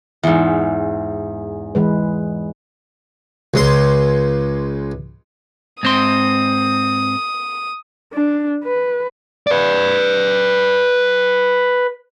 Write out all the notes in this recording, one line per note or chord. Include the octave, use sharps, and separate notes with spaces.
E2 G#2
E3 G#3 B4
C#2 G#3 C6
G#2 C4 C6 D#6
D4
B4
B4 D5